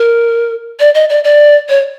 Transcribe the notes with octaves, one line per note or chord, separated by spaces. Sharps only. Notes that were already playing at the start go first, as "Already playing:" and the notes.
Already playing: A#4
D5
D#5
D5
D5
C#5